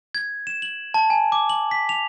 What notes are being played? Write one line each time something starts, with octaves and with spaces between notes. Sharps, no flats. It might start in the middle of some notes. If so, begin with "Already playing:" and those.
G#6
E7
F#7
A5
G#5
D6
F#7
B6
F7